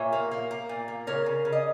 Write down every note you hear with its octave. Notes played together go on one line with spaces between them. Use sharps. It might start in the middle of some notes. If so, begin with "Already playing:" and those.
Already playing: A#2 C#5 E5
A#3
A#3
A#3
A#2
A#3
C#3 A#4 C#5
C#3
C#3
D#5